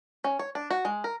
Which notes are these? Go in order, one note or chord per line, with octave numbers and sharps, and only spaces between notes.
C#4
C#5
D4
F#4
G#3
A#4